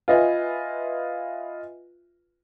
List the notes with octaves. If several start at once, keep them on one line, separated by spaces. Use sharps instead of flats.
F4 B4 D#5 E5 G#5